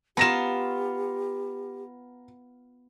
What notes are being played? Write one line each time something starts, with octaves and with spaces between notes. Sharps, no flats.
B3 F4 G4 A#5 A#6 E7